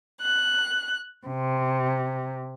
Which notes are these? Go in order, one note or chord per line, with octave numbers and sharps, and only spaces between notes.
F#6
C3